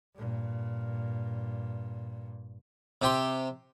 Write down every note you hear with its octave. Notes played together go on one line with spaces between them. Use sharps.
G2 A#2
C3 G4 C6